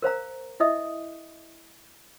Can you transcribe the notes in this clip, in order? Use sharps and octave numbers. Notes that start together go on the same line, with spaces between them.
A#4 C5 F5 A#5
E4 D#5 E5 D#6